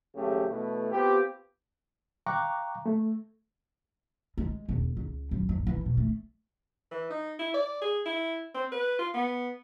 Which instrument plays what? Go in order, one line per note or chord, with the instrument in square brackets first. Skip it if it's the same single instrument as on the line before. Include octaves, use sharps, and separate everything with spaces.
[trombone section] G#1 C#3 F#3 A3 G4
B2 E3 A3
B3 C4 F4 G4
[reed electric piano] F5 G5 A#5 C#6 D6 F#6
A3
[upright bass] G#3
E1
C#2
F#2
G2
E3
B2
A3
[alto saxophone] E3
D#4
E4
D5
G#4
E4
C4
B4
F4
B3